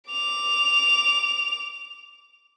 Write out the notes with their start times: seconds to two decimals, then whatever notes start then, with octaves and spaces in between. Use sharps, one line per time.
0.10 D6 F7